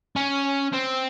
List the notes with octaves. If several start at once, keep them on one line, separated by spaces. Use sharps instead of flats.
C#4
C4